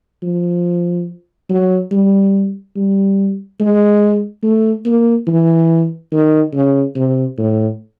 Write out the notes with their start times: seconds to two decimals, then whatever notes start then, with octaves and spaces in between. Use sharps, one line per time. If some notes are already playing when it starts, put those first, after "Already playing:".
0.23 F3
1.49 F#3
1.91 G3
2.76 G3
3.60 G#3
4.43 A3
4.86 A#3
5.27 E3
6.12 D#3
6.54 C#3
6.96 C3
7.38 A2